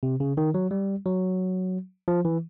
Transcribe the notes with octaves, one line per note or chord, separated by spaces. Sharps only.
C3
C#3
D#3
F#3
G3
F#3
F3
E3